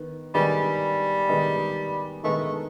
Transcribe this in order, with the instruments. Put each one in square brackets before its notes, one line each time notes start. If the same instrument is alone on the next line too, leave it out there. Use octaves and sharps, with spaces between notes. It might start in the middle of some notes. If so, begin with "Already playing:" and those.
Already playing: [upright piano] D#3 B3
[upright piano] D#3 G#3 B3 D#4 G#4 [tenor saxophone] G3
[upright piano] D#3 G#3 B3 D#4 G#4
[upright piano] D#3 G#3 B3 D#4 G#4 [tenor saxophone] A3